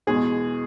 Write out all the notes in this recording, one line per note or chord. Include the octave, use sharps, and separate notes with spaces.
E2 B2 G#3 G#4